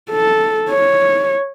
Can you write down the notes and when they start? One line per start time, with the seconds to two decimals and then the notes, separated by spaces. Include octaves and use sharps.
0.11 A4
0.70 C#5